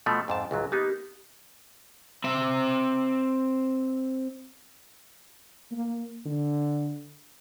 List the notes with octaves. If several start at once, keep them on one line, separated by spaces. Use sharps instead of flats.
B2 F3 A3
F2 G#2 A5
C#2 G#2 F#3
A#3 B3 D#4 G4
C4 E5
A#3
D3